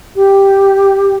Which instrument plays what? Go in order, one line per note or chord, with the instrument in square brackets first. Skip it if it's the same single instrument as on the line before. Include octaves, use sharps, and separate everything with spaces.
[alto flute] G4